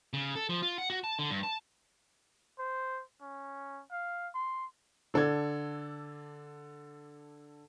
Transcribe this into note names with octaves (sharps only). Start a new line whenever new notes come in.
C#3
A4
F3
F4
F#5
F#4
A5
D3
G2
A5
C5
C#4
F5
C6
D3 A4 D5 G#6